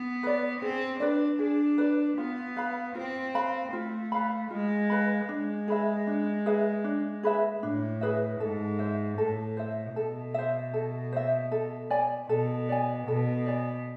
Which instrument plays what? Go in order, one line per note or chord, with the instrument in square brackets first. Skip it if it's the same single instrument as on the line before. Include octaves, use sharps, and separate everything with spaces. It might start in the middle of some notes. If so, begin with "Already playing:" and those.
Already playing: [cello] B3
[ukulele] B4 D5
[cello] C4 [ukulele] G#4
[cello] D4 [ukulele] B4 D5
[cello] D4 [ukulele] G#4
[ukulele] B4 D5
[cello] B3 [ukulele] F4
[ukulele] B4 F5 B5
[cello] C4 [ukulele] F4
[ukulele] B4 F5 B5
[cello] A3 [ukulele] F4
[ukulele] B4 F5 B5
[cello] G#3 [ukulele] F4
[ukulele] B4 F5 B5
[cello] G#3 [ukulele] D4
[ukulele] G#4 B4 E5
D4
G#4 B4 E5
D4
G#4 B4 E5
[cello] A2 [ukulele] D4
[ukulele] G#4 B4 E5
[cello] G#2 [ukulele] A4
[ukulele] C5 E5
[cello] A2 [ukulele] A4
[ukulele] C5 E5
[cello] B2 [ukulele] A4
[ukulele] C5 E5
A4
C5 E5
A4
D5 G#5
[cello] B2 [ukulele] A4
[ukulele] D5 G#5
[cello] B2 [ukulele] A4
[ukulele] D5 G#5